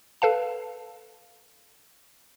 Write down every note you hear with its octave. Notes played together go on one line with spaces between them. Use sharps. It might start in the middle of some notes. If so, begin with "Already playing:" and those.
A4 B4 F5 A5